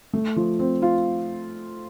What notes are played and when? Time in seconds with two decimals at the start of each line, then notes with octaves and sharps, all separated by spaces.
0.13 A3
0.36 F3
0.59 C4
0.82 F4